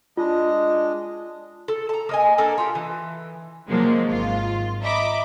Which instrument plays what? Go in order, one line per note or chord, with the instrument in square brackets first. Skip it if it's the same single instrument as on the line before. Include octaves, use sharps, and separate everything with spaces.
[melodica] G#3 D4 D#5 [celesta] F4
[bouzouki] A4
A5 A#5
A#3 D#5 G#5
A#3 D4 A4 A#4
F4 G4
E3
[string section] C#3 F3 F#3 G#3 A#3 C4
G#1 F4
D#5 E5 A#5 B5 D6